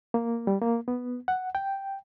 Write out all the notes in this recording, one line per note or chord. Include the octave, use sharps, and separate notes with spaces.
A#3
G3
A#3
B3
F#5
G5